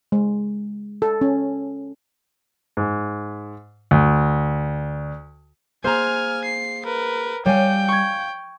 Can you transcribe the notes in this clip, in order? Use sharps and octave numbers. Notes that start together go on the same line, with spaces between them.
G#3
A4
C#4
G#2
D2
A#3 G#4 C5 G#5 A#5 F6
C7
A#4 B4
G3 C#5 F5 G5 G#5
C#6 G#6